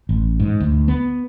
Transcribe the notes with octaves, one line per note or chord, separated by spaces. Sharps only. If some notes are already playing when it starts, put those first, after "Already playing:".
A1
G#2
D2
B3